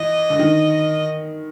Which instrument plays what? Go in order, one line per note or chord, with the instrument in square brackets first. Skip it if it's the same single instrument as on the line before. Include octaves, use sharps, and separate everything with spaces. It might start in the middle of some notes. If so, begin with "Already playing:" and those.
Already playing: [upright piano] E3 [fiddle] D#5
[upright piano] D3
D#3